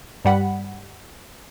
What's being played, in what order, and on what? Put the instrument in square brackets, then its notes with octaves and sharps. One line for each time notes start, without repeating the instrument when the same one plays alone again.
[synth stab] G2 G3 F#5 B5